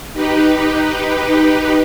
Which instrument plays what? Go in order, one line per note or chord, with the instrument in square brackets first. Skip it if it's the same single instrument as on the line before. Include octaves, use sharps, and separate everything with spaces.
[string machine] D#4 G4 B4